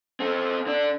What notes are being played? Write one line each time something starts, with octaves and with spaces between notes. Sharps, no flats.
C4 A4
D3 D4